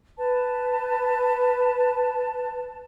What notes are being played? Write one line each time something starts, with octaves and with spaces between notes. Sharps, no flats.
B4 A5